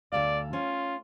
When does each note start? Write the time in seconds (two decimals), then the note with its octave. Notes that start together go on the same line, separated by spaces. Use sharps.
0.12 D2 A4 D5 F5
0.53 C#4 F4